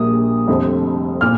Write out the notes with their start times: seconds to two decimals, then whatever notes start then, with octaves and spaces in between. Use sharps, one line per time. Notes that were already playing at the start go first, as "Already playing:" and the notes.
Already playing: A#1 A#2 G3 A#3 D#6
0.48 F1 F2 D3 G3 C4
1.21 A#2 F6